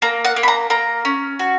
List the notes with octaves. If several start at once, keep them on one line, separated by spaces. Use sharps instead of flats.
A#3 A#5
F#5
A#3
B5
A#5
A#3 A#5
C#4
F#4